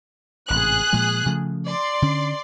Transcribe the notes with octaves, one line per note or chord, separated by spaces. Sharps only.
A1 G#2 C3 G#4 F#6
A#2 F3 G#3
C#3 F3 A3
D5 C6
D3 C#4